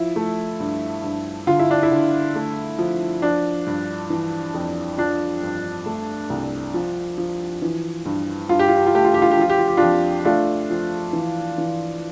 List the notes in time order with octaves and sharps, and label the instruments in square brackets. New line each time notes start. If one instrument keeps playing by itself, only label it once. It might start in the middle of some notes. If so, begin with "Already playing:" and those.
Already playing: [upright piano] F3 E4
A3
G2
G2
D3 F4
E4
D4
E4
D3
A3
F3
F3 D4
G2
E3
F2
F3 D4
G2
A3
C2
F3
F3
E3
G2
G2 F4
G4
F4
G4
F4
A3 G4
F4
G4
F4
G4
F3 F4
G4
F4
G4
F2 D4 F4
A3 D4 F4
F3
E3
E3